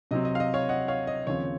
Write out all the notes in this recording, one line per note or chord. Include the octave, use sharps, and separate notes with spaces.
C3 F#3 C4 D#5
D#5
F5
D#5
C#5 F5
D#5 F#5
C#5 F5
D#5
D#2 C#3 F3 C4 C#5